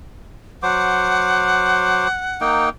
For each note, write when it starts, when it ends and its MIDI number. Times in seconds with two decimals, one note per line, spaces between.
0.63 2.08 54
0.63 2.08 72
0.63 2.67 78
0.63 2.08 86
2.41 2.69 58
2.41 2.69 63
2.41 2.69 79